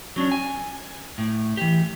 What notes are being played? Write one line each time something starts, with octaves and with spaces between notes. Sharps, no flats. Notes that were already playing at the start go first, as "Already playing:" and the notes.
F#3 C#4 D4
G#5
A2
E3 G4